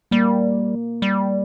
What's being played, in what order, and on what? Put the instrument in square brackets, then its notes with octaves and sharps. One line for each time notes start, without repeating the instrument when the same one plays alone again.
[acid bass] G3 [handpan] A#3
[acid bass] G3